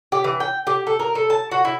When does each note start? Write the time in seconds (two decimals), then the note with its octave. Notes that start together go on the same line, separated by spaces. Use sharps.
0.12 G4
0.24 E3
0.40 G5
0.67 G4
0.87 A4
1.00 A#4
1.15 A4
1.30 A5
1.51 F#4
1.65 E4